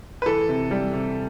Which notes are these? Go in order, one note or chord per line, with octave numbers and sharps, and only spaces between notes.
B4
E3 A4
C3
G3
C3